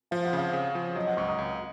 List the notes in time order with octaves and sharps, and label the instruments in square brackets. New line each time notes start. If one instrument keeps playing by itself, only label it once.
[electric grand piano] F3 [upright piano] F5
[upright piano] F#5
[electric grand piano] C#3 [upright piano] F5
[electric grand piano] C#3
F3
[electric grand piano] F#3 [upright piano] D#5
[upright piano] F#5
[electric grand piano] C#2 [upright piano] C#6
[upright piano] D#6
[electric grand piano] C#2